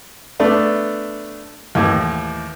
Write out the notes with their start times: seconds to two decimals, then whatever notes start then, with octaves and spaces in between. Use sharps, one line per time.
0.40 A3 B3 D4
1.75 D#2 A2 E3